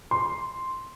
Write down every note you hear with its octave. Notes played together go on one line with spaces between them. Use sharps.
C6